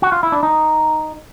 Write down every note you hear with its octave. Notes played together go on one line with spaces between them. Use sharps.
F#4
F4
E4
D4
D#4